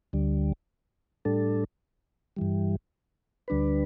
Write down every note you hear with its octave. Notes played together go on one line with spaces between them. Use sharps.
D2 D3 G3
A2 G3 D4 A4
G2 E3 G3
D2 D3 G3 D4 B4